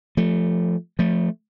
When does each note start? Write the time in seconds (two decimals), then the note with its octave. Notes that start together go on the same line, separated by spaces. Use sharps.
0.17 F3 A3
0.99 F3 A3